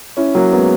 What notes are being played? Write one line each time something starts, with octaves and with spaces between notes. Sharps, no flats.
C#4 E4
F#3 A#3
G#3 B3